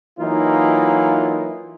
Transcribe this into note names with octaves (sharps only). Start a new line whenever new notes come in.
E3 F#3 A#3 D#4 F4